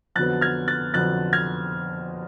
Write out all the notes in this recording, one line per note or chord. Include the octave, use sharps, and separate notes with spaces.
F2 D3 F#3 B3 F#6 A6
F6 G#6
F#6 A6
F2 D3 F#3 B3 F#6 A6
F6 G#6